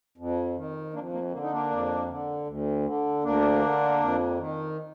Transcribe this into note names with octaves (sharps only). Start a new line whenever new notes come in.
F2
D#3
F2 A#3 D4
A#3
D3 A#3
D#4
A#3 D4
F2
D3
D2
D3
D2 A#3 D4
D3
F2
D#3